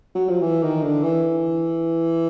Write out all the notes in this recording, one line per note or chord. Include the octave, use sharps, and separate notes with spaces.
F#3
F3
E3
D#3
D3
E3